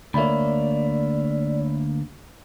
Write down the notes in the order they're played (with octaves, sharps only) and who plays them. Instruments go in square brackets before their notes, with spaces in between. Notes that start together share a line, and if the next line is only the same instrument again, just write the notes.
[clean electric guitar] D2 A#3 [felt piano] C#5 E5 B5 [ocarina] D5